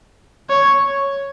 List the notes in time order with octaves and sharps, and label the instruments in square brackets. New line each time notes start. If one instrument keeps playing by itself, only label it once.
[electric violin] C#5